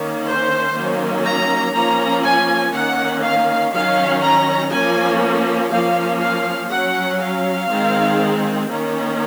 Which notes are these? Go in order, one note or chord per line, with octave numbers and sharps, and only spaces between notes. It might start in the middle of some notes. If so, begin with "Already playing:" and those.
Already playing: D#3 A#3 C#4
C5
D#3 F#3 A#3 C#4
A#5
F3 A#3 C#4 A#5
G#5
D#3 A#3 C#4 F#5
F5
D#3 F#3 C#4 F5
A#5
F3 A#3 C#4 G#5
F3 A#3 C#4 F5
F5
F#3 C#4 F#5
F5
D#3 G#3 C4
D#3 A#3 C#4